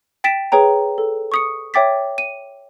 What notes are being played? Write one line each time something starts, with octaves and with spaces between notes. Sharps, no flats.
G5 A6 B6 D7 E7
G#4 B4 C#5 G5 A#5
A4
C#6 D#6 C#7
C#5 E5 G5 D6 A6 B6
D#7